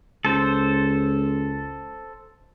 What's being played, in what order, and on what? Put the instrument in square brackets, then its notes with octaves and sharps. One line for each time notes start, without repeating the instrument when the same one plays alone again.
[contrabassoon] C#2 [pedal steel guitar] A4 C5